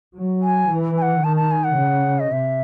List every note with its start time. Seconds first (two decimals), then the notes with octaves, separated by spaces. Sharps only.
0.16 F#3
0.43 G#5
0.70 E3
0.97 G#5
1.02 F#5
1.23 D#3 A5
1.37 A5
1.51 G#5
1.64 F#5
1.77 C#3
2.20 D#5
2.31 C3 E5